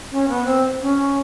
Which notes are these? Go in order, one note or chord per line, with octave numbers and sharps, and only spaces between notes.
C#4
B3
C4
C#4